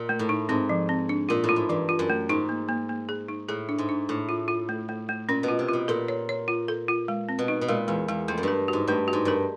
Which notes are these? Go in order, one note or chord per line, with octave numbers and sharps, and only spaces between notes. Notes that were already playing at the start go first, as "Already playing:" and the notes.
Already playing: A#2
A3
A2
D#4
G#2 C4
F3
C4
D4
A#2 F4
A2
F4
G#2
G2 E3
F4
F#2
A3
G#2 D#4
A#3
A#3
A#3
G#4
D#4
A2 G#4
D4
G#2
D4
A2 D4
F4
F4
A3
A3
A3
A#2 C#4
B2
F4
C3
B2 F4
A#2 A4
C#5
C#5
F4
A4
F4
G#3
C4
B2
D#4
B2
A#2 G#3
E2 G#3
E2 G#3
F2 A3
F#2
G2 A#4
G#2 F#4
G2 A3
F#4
G#2
G2 A#4